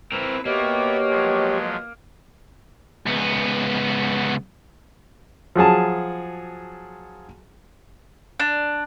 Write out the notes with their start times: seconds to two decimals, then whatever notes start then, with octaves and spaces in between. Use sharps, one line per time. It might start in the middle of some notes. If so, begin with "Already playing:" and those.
0.12 C4 E4 A#4 B4
0.45 B2 A#3 B3 G4 C#5 E5
1.09 F3 F#3 G#3
3.06 C#2 B3
5.56 F3 F#3 G#4 A5
8.40 D4